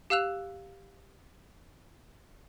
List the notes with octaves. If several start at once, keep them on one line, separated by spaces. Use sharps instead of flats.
G4 F5 E6 F#6 F7